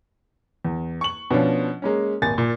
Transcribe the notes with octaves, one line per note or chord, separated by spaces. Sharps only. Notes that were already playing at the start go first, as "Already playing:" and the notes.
E2
C#6 F#7
B2 F3 C#4 D4 F4
G#3 A#3 C#4
D#1 G#1 G#5 A6
A#2